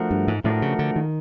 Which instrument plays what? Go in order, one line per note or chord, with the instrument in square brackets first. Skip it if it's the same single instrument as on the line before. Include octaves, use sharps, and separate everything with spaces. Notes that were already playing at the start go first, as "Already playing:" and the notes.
Already playing: [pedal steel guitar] F3 A3 D4 F#4 A#4
[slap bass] G2
G#2
[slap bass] A2 [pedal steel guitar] F3 A3 D4 F#4 A#4
[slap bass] C#3
D3
D#3